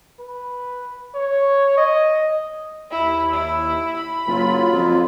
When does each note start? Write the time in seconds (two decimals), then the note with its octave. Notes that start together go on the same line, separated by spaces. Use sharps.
0.20 B4
1.14 C#5
1.78 D#5
2.91 D#2 E4
3.32 E4
3.97 B5
4.27 F#1 F#3 F4
4.73 F2